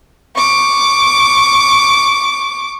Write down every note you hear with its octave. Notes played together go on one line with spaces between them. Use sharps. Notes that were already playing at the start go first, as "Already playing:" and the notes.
C#6 D6